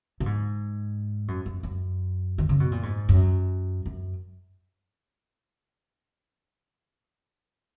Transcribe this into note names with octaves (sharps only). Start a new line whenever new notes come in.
A#2
G#2
F#2
F#2
F#2
D#3
C#3
B2
A#2
G#2
F#2
F#2